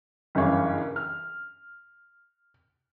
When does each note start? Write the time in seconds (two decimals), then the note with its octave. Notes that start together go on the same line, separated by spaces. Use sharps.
0.35 F#1 G2 C#3 E3 C#5 F5
0.96 F6